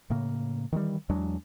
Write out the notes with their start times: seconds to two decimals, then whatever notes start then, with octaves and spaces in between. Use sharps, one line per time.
0.10 A2 C#3 A#3
0.72 D#3 E3 F#3 G3
1.09 E2 F#3 G#3 D4